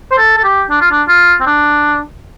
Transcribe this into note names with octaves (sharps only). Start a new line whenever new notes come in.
C5
A4
A4
G4
D4
F4
D4
F4
C4
D4